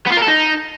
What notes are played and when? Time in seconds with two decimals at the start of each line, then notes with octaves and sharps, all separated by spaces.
0.07 B3
0.12 F4
0.17 A#4
0.22 A4
0.28 D#4